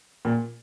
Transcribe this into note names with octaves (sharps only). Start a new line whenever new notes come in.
A#2